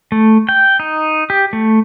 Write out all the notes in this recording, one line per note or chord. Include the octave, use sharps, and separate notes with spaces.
A3
G5
D#4
G4
A3